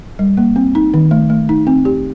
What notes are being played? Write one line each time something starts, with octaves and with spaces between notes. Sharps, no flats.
G3
A#3
C4
D#4
D#3
A3
A3
D#4
C4
G4